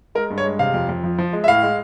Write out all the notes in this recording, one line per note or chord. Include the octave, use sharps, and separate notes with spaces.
G#3 A#4
G2
C#5
G#3
C3 F5
F2
F2
F3
F3
G#3
E5
A2 F5
G#3